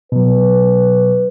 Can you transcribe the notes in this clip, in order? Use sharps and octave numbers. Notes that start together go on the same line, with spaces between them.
B2 F#3 B4